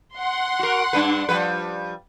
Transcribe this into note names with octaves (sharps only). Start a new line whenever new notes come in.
F#5 C6
F#4 A#4
G2 D4 B4
F3 G3 B4